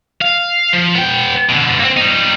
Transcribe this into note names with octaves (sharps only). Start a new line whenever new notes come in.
F5
F3
B3 G5
B2 D3
A#3 C4
G3 D#4